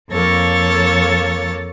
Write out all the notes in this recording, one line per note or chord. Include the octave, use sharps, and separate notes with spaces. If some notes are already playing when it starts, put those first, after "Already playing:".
F2 A#3 A4 C#5 A6